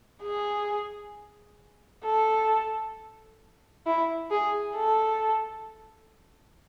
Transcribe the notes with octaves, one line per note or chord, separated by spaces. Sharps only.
G#4
A4
E4
G#4
A4